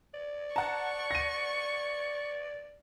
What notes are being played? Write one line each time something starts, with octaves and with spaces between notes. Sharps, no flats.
D5
F#5 A5 A#5 C#6
A#6 D#7